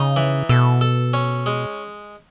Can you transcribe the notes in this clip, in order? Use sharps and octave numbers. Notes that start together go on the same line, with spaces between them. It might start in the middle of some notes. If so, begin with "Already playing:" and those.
Already playing: C#3 D#4
E3
B2 A4
A4
C#4
G#3